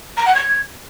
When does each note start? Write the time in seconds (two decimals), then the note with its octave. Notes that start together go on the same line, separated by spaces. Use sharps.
0.17 A#5
0.26 F#5
0.35 G#6